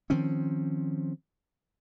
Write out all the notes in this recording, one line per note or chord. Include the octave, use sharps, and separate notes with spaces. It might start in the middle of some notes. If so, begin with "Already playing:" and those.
D#3 F3 C4 C#4